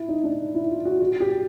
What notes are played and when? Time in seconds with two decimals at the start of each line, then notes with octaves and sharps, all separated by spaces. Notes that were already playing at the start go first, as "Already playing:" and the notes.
Already playing: E4
0.08 D#4
0.24 D4
0.55 E4
0.70 F4
0.85 F#4
1.01 F#4
1.20 G4